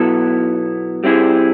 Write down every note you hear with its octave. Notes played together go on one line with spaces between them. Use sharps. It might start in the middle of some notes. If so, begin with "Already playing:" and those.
Already playing: B2 F#3 B3 E4 A4
G3 C4 E4 G#4